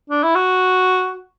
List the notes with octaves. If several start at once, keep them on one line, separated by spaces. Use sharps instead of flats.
D4
E4
F#4